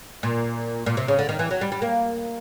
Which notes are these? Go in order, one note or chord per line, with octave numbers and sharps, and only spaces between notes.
A#2
A#2
C3
C#3
D3
D#3
E3
F#3
G3
G3
A#3